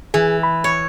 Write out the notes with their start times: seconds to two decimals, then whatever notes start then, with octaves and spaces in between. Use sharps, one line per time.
0.14 E3 G#4
0.43 B5
0.64 C#5